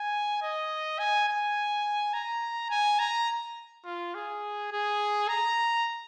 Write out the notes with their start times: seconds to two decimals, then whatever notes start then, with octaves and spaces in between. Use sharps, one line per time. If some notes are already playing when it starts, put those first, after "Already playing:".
Already playing: G#5
0.42 D#5
0.99 G#5
1.28 G#5
2.14 A#5
2.70 G#5
2.99 A#5
3.85 F4
4.15 G#4
4.72 G#4
5.29 A#5